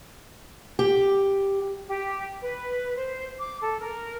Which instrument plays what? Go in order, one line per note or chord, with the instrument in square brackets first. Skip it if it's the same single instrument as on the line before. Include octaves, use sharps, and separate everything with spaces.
[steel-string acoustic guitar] G4
[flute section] G4
B4
C5
D6
A4
A#4